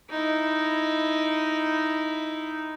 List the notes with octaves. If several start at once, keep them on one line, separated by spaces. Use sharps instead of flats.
D#4 E4